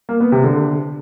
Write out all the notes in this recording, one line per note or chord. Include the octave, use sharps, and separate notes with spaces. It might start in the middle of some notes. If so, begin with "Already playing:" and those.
A#3
B3
C3
D3